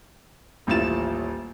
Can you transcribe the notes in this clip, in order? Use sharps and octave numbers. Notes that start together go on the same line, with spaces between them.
D#1 A1 E4 F4 A6 E7